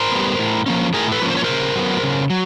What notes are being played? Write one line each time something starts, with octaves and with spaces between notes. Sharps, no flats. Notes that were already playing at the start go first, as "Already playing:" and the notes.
Already playing: A#4 C5
G3 B3
A2
F3 A#3 C#4
A2 G#4 A#4
A4 B4
F3 A#3 C#4
C5
C#5
C#3 A#4 C5
F#3 B3
C#3
F#3